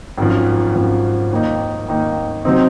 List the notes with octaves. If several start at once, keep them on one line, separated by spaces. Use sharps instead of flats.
G#1 F#2 F3
G#1 F#2 F3
D#2 D#3 A#3 D#4
D#2 D#3 A#3 D#4
C3 F#3 C4 D#4